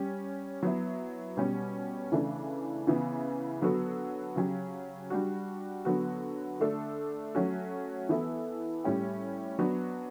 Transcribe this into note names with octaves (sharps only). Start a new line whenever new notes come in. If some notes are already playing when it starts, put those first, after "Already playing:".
Already playing: G3 C#4 G4
F#3 B3 E4
B2 G3 C#4
C#3 E3 A3 D4
C#3 E3 B3
D3 F#3 B3 F#4 A4
C#3 F#3 C#4 G4
G3 D4 F#4
D3 F#3 B3 F#4
D3 A3 D4 A4
F#3 A3 C#4 F#4
E3 B3 E4 A4
A2 G3 C#4 G4
F#3 B3 D4 F#4